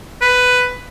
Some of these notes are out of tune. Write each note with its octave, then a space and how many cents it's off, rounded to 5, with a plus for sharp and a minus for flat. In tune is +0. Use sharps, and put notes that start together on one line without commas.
B4 +10